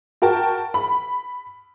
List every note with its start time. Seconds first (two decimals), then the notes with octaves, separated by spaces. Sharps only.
0.22 F#4 A#4 G5 A5
0.74 B5